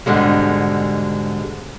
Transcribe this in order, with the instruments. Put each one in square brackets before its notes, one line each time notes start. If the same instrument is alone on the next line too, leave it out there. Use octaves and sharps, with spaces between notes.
[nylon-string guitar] G#2 B2 D3 G3 G#3